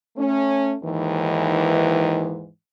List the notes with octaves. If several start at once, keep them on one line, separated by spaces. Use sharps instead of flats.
A3 C#4
D#2 G#2 E3